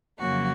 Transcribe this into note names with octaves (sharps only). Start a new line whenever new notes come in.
F2 C#3 F#3 A#3 F#4